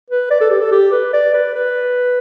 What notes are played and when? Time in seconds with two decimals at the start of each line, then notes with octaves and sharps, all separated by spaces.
0.10 B4
0.30 D5
0.41 A4
0.50 G4
0.61 A4
0.71 G4
0.92 B4
1.13 D5
1.34 B4
1.55 B4